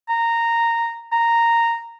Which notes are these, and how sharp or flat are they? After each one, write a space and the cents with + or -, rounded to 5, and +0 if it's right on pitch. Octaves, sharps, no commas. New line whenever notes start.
A#5 -10
A#5 -10